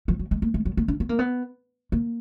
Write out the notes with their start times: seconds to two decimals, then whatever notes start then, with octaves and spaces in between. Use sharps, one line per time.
0.08 F3
0.19 F#3
0.31 G#3
0.42 A#3
0.54 G#3
0.65 F#3
0.77 A#3
0.88 C#4
1.00 B3
1.09 A#3
1.19 B3
1.92 A#3